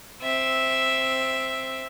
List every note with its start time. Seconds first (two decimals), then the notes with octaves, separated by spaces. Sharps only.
0.22 C4 E5